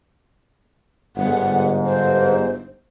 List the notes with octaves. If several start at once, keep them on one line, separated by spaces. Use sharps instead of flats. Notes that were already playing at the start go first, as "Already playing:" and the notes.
G1 G#2 F#5
C5